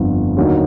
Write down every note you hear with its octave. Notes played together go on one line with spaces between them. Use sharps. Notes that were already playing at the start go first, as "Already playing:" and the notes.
Already playing: G1 F2 D3
D#2 D3 F#3 A#3 D#4